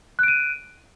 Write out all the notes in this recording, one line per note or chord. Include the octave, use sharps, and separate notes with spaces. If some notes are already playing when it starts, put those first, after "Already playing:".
F#6 D7 D#7